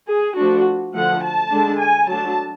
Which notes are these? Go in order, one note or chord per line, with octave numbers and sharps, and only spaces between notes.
G#4
F3 A3 D4 F#4
D3 F3 A3 F#5
A5
D3 G#3 D4
G#5
F#3 A3 D4 A5